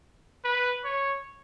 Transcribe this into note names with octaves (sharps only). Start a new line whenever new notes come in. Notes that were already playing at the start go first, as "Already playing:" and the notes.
B4
C#5